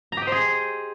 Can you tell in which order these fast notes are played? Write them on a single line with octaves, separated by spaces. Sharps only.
A#5 G4 D#5 C5 G#4